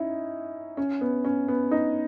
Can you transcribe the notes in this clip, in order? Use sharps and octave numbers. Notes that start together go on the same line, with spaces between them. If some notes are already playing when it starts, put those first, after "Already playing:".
Already playing: C#4 D#4 E4
C#4
B3
C#4
B3
D#4